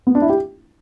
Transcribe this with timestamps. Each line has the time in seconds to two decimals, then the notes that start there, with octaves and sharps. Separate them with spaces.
0.07 B3
0.15 D4
0.22 E4
0.29 G4